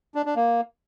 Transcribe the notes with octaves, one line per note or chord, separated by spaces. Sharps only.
D4
D4
A#3